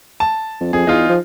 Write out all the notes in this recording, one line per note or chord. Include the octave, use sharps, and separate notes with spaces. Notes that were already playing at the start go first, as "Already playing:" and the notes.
A5
F2
F2 G#4
E2 D#4 F4 G#4
F3